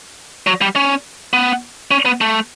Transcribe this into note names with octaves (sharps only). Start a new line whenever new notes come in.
F#3
G3
C#4
B3
C#4
B3
A3